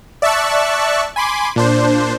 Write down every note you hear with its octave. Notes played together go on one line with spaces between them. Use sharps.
D5 E5 A5 C#6 E6 F#6
G#5 B5 C6 D6
A#2 D4 C5